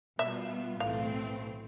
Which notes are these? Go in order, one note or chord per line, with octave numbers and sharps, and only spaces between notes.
B2 G3 B3 F4 E5
B1 A2 E3 A3 C4 F5